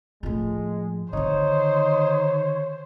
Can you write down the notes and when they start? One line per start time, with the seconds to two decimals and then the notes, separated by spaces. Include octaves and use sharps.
0.23 A2 F3 G#3
1.13 D3 D#3 D#4 C5 C#5